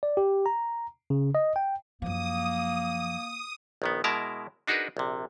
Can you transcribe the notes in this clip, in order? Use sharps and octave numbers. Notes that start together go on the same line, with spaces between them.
D5
G4
A#5
C#3
D#5
G5
F#2 F3 A#3 D#6
A#1 D#3 B3
B2 G#3 E4 A#4 A5 A#5
D4 D#4 F#4 G#4 A#4 B4
A#1 C3